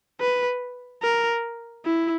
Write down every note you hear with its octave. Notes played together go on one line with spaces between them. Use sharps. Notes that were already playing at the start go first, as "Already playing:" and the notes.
B4
A#4
E4